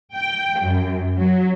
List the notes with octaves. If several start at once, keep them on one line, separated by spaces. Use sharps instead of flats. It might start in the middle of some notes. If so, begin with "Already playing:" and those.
G5
F#2
F#3